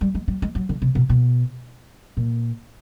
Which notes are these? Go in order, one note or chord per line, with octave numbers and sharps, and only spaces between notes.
G3
G#3
G3
G#3
F#3
D3
C3
B2
B2
A#2